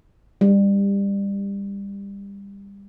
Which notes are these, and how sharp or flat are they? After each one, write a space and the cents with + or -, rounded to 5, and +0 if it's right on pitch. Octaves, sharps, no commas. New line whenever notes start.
G3 +25